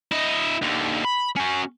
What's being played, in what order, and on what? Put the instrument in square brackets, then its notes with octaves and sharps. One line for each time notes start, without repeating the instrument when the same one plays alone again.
[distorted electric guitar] E4 D#5
D#2 D3
B5
C#4 F#4